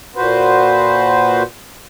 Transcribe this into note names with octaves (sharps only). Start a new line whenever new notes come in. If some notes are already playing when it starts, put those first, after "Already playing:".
A#2 F#4 B4 C5